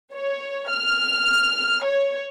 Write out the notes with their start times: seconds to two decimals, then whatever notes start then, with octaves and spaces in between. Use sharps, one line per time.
0.14 C#5
0.70 F6
1.85 C#5